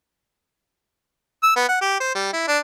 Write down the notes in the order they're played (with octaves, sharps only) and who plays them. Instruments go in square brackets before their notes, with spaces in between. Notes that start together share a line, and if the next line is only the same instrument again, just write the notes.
[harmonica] E6
B3
F#5
G4
C5
G3
E4
D4